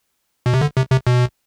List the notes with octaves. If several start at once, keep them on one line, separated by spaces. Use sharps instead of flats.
B2
C3
D3
C3
C3
B2